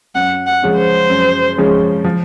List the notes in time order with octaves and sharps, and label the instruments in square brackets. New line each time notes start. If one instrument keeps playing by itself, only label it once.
[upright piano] F#2 [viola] F#5
[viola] F#5
[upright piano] C#3 F3 G#3 C#4
[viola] C5
[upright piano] F#2
C#3 F3 G#3 C#4
F3